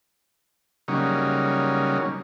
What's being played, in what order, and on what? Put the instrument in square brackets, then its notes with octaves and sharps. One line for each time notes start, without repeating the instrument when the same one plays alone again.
[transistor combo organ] C#3 F#3 G3 A#3 C#4 D#4